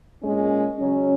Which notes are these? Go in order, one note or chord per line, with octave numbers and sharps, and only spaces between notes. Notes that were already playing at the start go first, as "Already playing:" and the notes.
A#2 G#3 C#4
C#3 F#3 C#4